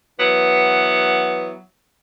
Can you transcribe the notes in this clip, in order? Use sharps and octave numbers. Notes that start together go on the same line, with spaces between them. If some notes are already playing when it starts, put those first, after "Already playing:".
E3 F#3 B3